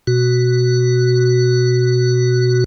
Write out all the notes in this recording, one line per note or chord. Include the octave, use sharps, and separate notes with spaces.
B2 F#4